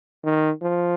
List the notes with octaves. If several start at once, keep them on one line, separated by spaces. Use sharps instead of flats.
D#3
F3